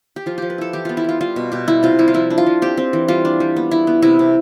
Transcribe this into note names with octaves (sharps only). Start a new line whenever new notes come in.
G4
F3 F4
F3 G4
B4
E4 A4
E3 G4
B3 F4
E4
B3 F4
G3 F4
B2
B2 G4
G3 E4
C3 F4
G3 E4
F4
F3 E4
D4
F4
F3
C4 G4
C4
E3
G3 F4
D4
G3
B3
E4
B3
C3 E4
C3